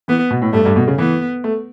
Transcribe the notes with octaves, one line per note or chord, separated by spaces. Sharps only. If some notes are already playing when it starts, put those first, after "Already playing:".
E3 B3
B2
A2
G2 A3
G2
B2
C#3
E3 B3
A3